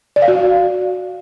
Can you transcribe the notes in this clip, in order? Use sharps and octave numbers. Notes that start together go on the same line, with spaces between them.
D5
F5
F#4